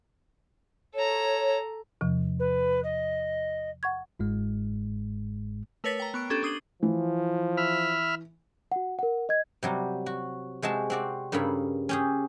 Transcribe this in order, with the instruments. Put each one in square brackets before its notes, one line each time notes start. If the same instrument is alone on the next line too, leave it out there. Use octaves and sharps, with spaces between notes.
[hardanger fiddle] A4 A#5 [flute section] C#5
[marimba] E2 C3 F3
[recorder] B4
D#5
[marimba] F#5 C#6 G#6
[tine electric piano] G1 G#2 G#3
[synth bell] A3 A#4 B4 C#5 A6 B6
G5 A#5
B3 C#6 D7
C#4 D4 G4 A4
D4 D#6 C7 D#7 F#7 G7
[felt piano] E3 [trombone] F3
[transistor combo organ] E5 B5 F6
[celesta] F#4 F#5
A#4 F#5
D#5 G#6
[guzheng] C3 F#3 G3
F#4
C3 G#3 F#4 A5
C4 F#4 D5
G2 C#3 A#3 A4 B5
C#4 G4 G#4